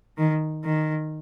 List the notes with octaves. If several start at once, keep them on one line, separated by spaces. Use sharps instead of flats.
D#3
D#3